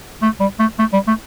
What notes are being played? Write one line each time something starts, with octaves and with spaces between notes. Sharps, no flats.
A3
G3
A3
A3
G3
A3